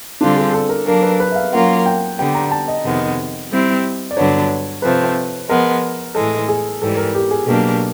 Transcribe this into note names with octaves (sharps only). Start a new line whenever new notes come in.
D3 G3 C4 D4 F4 A4
G#4
A4
A#4
F#3 A#3 D4 A#4
B4
B4
E5
F5
F#3 A#3 C#4 F4 A#4 F#5
G5
D3 G3 B3 G5
A#5
A5
D#5
F2 C3 D#3 G#3 B3
G3 C4 E4 G4
D5
G2 D3 F#3 B3 D4 C#5
C3 F3 A3 C4 B4
F3 G#3 B3 A#4
A2 E3 G#3 A4
G#4
G#2 E3 G3 A4
A#4
G4
G#4
B2 F#3 A#3 D4 G4 G#4